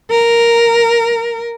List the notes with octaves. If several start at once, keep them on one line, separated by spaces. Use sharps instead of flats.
A#4